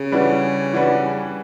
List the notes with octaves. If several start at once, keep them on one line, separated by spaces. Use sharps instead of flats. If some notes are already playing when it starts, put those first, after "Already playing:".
Already playing: C#3
E3 G3 D4 F#4 B4
E3 G3 D4 F#4 B4